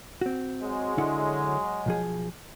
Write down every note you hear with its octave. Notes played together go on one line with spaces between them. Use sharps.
C4 F#4
F#3 G#3
D3 E4 F#5
B1 F3 G#4